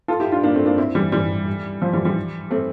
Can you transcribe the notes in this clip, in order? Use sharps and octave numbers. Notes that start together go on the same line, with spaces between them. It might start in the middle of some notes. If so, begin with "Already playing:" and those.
F4 A4
E4 G4
D4 F4
A#3 D4
A3 C4
A#3 D4
C4 E4
E3 G3
E3 G3
F3
E3 G3
E3 G3
A3 C4